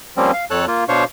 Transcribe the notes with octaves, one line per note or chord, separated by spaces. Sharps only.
F3 G3 A#3 C4 C#4
F5
F2 A4 C#5 A5 F#6
A#3 F4
B2 D4 C5 C#5 F5 C#6